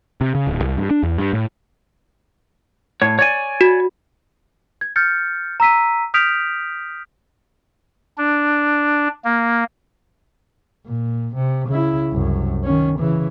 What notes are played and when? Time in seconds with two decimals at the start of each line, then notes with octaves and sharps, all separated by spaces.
0.21 C3
0.35 C#3
0.47 D1
0.62 C2
0.77 G2
0.91 D4
1.03 E2
1.18 G2
1.33 A2
3.02 A2 C#5
3.19 C#5 D5 G#5
3.61 F#4
4.81 G#6
4.96 F6 G6 A6 C#7
5.60 A#5 E6 B6 D#7
6.14 D#6 F6 G6 B6 D7 F7
8.18 D4
9.25 A#3
10.87 A#2
11.35 C3
11.68 C#3 E4
12.11 C2 F#2
12.64 D#3 C#4
12.99 C#3 E3